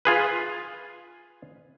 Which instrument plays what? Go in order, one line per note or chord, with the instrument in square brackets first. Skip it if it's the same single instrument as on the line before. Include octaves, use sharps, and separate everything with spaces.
[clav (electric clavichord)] F4 G#4 B4